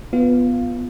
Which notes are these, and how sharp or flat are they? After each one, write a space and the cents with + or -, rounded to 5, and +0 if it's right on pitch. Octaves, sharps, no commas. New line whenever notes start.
B3 +0 F4 +0 F5 +0